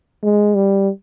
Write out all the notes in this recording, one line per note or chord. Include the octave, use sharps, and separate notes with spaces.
G#3
G3